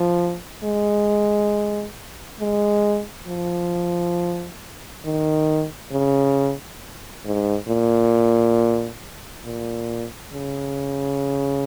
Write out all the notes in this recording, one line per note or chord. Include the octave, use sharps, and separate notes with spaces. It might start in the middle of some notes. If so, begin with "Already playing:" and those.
Already playing: F3
G#3
G#3
F3
D#3
C#3
G#2
A#2
A#2
C#3